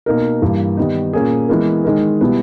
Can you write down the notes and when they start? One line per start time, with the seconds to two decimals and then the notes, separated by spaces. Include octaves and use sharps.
0.06 B2 A#3 D#4 A#4
0.42 G2 E3 A#3
0.77 D#3 G3 B3 D#4
1.13 A#2 A#3 C#4 G#4
1.49 E3 G#3 B3 E4 A#4
1.84 D#3 G#3 D#4 A#4
2.21 B2 G3 B3 E4